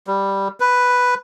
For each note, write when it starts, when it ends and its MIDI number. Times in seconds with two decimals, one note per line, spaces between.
0.07 0.48 55
0.60 1.14 71